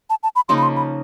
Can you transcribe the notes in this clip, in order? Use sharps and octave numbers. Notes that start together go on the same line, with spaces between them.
A5
A5
B5
C#3 F3 A#3 D#4 C6
B5
C6
B5